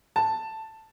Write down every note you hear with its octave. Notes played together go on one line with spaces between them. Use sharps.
A5